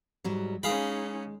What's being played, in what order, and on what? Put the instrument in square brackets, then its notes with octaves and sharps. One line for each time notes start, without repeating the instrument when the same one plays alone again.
[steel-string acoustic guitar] G#2 F#3 G3
[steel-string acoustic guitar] G#3 [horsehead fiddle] C#4 D#4 [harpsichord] G#4 F5 B5